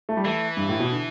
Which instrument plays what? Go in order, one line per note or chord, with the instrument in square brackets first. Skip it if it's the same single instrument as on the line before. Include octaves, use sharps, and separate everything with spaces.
[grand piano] A3
G3
[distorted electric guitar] E3 [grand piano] A3
[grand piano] G2
A2
B2
D3